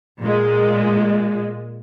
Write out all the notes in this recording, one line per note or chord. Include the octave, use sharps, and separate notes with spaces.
A#2 G#3